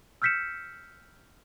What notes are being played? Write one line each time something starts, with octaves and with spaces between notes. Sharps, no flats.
E6 F6 G6 B6 C#7 E7